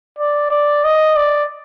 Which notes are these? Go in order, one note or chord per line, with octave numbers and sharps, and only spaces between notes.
D5
D5
D#5
D5